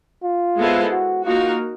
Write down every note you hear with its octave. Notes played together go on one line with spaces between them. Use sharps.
F4
G#3 B3 E4 A4 C5
F#4
A#3 D#4 F4 F#4 A#4